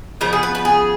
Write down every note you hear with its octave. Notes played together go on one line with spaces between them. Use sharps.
C#3 F3 B3 A#4
G#4
B4
B4
G#4